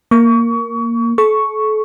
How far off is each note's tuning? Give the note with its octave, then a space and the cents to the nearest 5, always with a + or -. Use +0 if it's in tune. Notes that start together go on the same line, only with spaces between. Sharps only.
A#3 +0 C#6 +30
A4 -35 C#6 +0